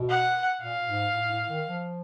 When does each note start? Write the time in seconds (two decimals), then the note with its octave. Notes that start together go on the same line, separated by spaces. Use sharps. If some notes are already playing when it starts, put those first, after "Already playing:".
Already playing: B2
0.09 F#5
0.61 A#2 F5
0.87 G#2
1.14 A2
1.31 A2
1.49 D#3
1.66 F3